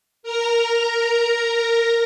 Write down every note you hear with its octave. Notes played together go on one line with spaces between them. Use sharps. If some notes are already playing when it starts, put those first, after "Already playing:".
A#4 A#5